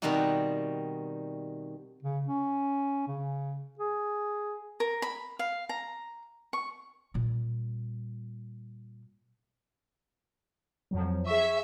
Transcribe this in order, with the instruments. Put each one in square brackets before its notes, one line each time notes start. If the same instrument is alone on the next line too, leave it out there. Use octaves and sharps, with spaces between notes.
[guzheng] B2 D#3 G3 C4 D#4 F#4
[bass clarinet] C#3
C#4
C#3
G#4
[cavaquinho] A#4
B5
F5
A#5
C#6
[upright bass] A#2 G3
[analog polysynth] F2 F3 F#3
[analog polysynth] G#4 C#6 [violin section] E5